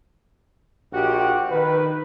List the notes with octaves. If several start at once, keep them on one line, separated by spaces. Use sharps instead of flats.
A#1 F#4 G4
D#3 B4